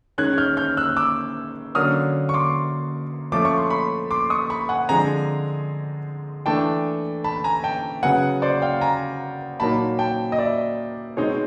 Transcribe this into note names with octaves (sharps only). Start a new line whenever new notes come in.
D#3 G#3 C#4 F#6 G#6
F6 G6
F6 G6
E6 F#6
D6 E6
D3 F#3 A#3 C#4 D#6 F6
C#6
C6 D6
F3 A3 C#4 D6
C#6
C6
B5 C#6
C6 D6
C#6 D#6
B5 C#6
F#5 G#5
D3 F3 G#3 C4 G#5 A#5
E3 A3 D4 G5 A5
A5 B5
G#5 A#5
G5 A5
C#3 F#3 B3 F#5 G#5
C5 D5
F5 G5
G#5 A#5
A#2 F#3 A#3 D#4 A5 B5
G5 A5
D#5
D5 E5
B2 G#3 C4 D#4 C#5